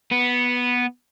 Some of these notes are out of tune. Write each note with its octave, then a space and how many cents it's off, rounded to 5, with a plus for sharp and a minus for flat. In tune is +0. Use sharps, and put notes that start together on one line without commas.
B3 -5